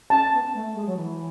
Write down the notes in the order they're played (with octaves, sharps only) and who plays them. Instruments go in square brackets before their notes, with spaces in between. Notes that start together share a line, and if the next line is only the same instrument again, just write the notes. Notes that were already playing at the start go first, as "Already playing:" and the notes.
[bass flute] C#4 [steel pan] A5
[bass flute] B3
A3
G#3
F#3
E3